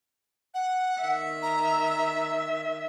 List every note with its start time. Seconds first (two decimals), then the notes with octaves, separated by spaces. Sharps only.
0.54 F#5
1.02 D#3 E5
1.42 A#5